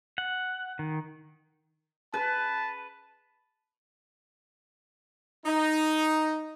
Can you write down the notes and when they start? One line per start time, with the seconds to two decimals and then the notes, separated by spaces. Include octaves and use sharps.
0.18 F#5
0.79 D#3
2.14 B4 A5
5.45 D#4